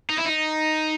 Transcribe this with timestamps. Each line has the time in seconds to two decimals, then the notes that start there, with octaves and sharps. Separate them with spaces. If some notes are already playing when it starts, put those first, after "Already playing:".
0.10 D#4
0.18 E4
0.26 D#4